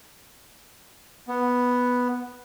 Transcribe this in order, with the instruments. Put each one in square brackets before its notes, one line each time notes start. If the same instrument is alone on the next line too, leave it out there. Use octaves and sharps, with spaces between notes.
[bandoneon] B3